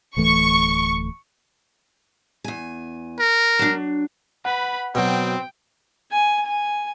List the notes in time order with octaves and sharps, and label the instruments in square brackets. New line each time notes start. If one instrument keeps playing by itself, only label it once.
[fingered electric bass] D1 E3 A3 [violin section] C#6
[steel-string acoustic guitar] E2 G#5
[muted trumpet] A#4
[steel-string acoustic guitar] F#3 D4
[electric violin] B4 B5 [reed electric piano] F#5
[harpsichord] B2 F#3 [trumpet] C4 [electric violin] G5
[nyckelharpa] G#5
G#5